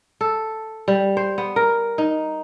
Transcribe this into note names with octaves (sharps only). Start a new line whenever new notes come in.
A4
G3
C5
B3
A#4
D#4